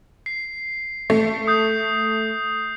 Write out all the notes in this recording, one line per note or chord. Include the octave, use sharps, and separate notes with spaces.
C7
A3
D#6 G6 C7